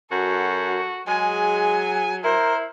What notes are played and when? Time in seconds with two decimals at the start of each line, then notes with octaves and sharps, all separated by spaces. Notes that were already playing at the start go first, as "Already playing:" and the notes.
0.11 F#2 F#4 A4
1.07 F#3 G#3 G#4 G#5
2.24 E4 A#4 C5